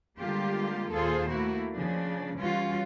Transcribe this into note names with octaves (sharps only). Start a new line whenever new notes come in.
D3 G3 G#3 A#3 F4 G4
D#2 A#2 F4 G#4 A4 C5
A3 A#3 E4 F#4
C#3 F3 D4
E3 G3 C#4 F4 F#4